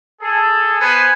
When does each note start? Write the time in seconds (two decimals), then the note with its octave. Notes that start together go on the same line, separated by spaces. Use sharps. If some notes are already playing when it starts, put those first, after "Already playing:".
0.22 G#4 A4
0.81 B3 B4 C5 G#5